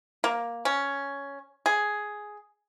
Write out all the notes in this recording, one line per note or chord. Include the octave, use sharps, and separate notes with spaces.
A#3
C#4
G#4